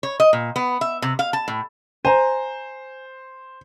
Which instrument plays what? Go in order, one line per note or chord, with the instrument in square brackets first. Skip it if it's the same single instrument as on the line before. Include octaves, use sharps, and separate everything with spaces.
[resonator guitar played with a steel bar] C#5
D#5
A#2
B3
E5
C3
F5
A5
A2
[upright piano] C5 [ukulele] G#5 A#5